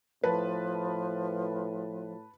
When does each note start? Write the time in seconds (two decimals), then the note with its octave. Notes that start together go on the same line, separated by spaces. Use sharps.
0.24 A2 F3 B4 A5